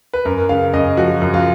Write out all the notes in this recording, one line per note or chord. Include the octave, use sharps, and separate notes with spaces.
B4
F#2 A#4
C#3 F5
F#2 D#5
F3 F#4
F#2
F4